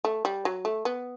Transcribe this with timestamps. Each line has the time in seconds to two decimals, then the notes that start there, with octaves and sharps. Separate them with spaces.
0.05 A3
0.25 G3
0.45 F#3
0.65 A3
0.85 B3